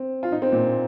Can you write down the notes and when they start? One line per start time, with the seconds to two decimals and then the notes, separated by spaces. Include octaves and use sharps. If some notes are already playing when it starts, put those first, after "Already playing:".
Already playing: C4
0.23 F4
0.32 D#4
0.42 C4
0.52 A#2